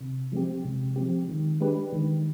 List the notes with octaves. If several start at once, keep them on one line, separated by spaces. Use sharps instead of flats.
C3
F3 G#3 C4 G4
C3
F3 G#3 C4 G4
D#3
G#3 D4 G4 B4
D#3